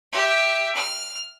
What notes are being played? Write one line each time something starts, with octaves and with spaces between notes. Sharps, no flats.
G4 E5
F6